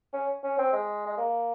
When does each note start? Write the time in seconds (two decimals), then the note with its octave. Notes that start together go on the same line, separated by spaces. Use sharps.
0.14 C#4
0.44 C#4
0.59 C4
0.73 G#3
1.07 G#3
1.18 A#3